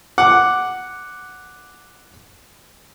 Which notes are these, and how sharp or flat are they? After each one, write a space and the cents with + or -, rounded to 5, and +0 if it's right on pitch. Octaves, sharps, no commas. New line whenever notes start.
F#5 +0 D6 +0